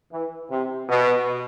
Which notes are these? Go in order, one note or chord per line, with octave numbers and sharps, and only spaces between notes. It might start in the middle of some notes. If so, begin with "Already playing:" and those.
E3
C3
B2